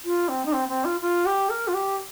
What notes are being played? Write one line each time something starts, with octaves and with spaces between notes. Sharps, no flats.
F4
C4
D#4
C4
C4
F4
F4
G4
A#4
F4
G4